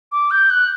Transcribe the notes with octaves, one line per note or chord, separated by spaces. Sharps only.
D6
G6
F#6